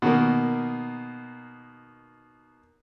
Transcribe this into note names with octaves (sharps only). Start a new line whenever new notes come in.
B2 D#3 A#3